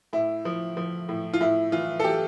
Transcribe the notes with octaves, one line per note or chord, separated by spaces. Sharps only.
A2 E4
F3
F3
A2
F4
A2 E4
E3 F4
A4
E3 G4